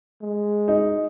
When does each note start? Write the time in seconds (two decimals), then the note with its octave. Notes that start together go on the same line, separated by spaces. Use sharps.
0.22 G#3
0.68 D#4